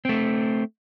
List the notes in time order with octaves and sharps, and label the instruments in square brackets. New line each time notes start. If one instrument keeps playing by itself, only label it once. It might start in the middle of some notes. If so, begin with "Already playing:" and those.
[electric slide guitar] A3 C4